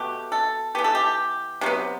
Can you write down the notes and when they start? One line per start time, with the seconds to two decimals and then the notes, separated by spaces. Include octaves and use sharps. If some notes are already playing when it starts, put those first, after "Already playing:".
Already playing: B2 A3 G4
0.32 A4
0.75 E3 B3 G4
0.84 A4
0.95 G4
1.61 C3 F#3 B3